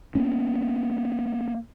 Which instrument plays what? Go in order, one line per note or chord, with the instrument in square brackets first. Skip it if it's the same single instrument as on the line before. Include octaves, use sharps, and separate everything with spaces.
[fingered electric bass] A#3 B3 C#4